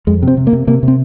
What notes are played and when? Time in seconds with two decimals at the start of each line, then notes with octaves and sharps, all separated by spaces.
0.07 F2 G#3
0.22 C3
0.28 C4
0.37 C3
0.47 A#3
0.53 C3
0.67 C3 A#3
0.83 C3
0.88 C4